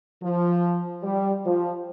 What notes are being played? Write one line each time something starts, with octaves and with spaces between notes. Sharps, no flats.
F3
G3
F3